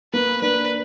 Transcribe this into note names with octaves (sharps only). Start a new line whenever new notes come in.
A#3 B4
A#3 D4 B4